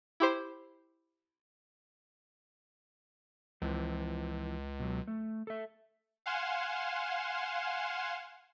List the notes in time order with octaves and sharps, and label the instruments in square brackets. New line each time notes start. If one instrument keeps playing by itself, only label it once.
[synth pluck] E4 G4 C5
[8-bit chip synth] C#2 [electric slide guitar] E3 F3 C4
[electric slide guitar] B2 F#3
A3
A4 E5
[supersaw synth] F5 F#5 G#5 C6 E7